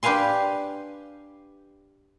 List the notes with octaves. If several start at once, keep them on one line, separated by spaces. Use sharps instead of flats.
D4 G4 B4 F5 G#5 C6